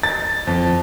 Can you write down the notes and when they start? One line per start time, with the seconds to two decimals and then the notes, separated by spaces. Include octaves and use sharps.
0.03 A6
0.47 F2